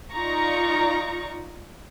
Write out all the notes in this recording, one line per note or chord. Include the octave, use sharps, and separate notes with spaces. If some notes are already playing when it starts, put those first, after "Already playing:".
D#4 F4 D5 A#5 C#6